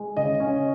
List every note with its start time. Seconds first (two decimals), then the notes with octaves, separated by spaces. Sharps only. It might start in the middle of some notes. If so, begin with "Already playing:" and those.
Already playing: G#3
0.17 C#3 D#5
0.40 C#4